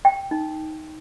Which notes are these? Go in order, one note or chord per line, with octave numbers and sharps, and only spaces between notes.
G5
D#4